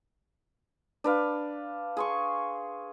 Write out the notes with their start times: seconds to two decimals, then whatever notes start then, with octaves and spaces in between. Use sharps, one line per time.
1.04 D4 B4 F5
1.97 G#4 C6 C#6